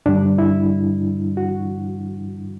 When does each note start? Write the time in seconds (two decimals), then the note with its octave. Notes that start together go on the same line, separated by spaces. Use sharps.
0.06 G2 D3 G3 D4
0.38 E4
1.37 F#4